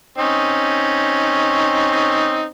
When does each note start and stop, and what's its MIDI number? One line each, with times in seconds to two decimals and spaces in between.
0.18 2.49 60
0.18 2.49 61
0.18 2.49 63